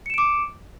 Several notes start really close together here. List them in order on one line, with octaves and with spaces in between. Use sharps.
C#7 E7 D7 D6